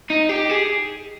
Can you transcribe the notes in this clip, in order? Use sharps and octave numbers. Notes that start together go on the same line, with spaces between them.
D#4
G4
G#4